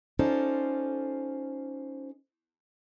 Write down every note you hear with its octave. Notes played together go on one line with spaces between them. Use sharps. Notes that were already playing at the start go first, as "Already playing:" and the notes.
C#4 D#4 F4 A4 C5 D5